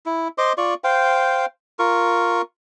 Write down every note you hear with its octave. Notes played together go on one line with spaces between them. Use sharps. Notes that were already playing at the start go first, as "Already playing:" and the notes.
E4
C5 D#5 C6 D6
F4 D5 C#6
C5 F5 G5
F4 A#4 C#6